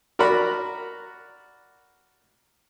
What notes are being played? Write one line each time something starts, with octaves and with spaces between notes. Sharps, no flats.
F#4 A#4 D5 F#5 B5